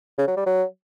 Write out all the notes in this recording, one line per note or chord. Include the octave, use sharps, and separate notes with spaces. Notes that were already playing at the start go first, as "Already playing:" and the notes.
C#3
F#3
G3
F#3